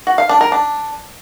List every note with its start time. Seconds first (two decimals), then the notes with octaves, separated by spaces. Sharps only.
0.07 F#4
0.18 F5
0.29 D4
0.41 A#4
0.52 D4